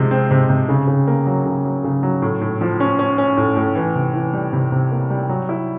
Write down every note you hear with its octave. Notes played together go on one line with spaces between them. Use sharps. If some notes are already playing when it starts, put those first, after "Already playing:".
Already playing: C3 F3 G#3 C4
C4
C3
C3
C#3
C#3
A#3
F#3
C#3
F#3
C#3
F#3
A2
A2
F3
C#4
C#4
C#4
A2
A2
E3
C3
E3
G3
C3
C3
A#3
G3
F#3
E4